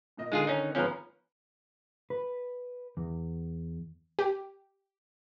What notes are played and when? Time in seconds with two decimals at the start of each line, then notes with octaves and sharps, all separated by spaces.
0.17 A#2 A#3 D#5
0.32 D3 D#3 G#3 F4 G#4
0.47 C#4 D#4
0.75 G#2 F3 B3 C#4 B4 A#5
2.10 B4
2.97 E2
4.19 G4